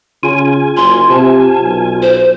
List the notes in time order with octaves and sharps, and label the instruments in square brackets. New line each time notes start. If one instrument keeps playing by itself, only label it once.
[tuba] C#3 [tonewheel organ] F4 G#5
[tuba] F#1 [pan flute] C6
[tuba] C3 [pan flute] A5
[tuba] B1
[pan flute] C5